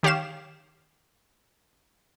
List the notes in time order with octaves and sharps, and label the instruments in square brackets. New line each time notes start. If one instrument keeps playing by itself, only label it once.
[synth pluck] D#3 G4 C#5 F5 E7